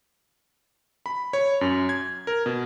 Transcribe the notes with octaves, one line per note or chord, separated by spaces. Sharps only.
B5
C#5
F#2
G#6
A#4
B2